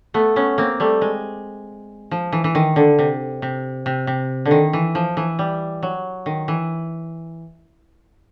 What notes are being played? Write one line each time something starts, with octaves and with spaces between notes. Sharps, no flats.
A3 B3
B3 C#4
A#3 C4
G3 A3
G#3
F3
E3
E3
D#3
D3
C3
C3
C3
C3
D3
D#3
E3
F3
E3
G3
F#3
D#3
E3